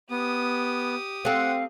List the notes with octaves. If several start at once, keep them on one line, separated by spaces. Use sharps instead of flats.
B3 G4 D#6
C4 A4 F5 F#5